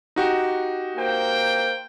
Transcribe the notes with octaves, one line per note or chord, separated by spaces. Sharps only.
D#4 F#4 G4
A#3 C5 G5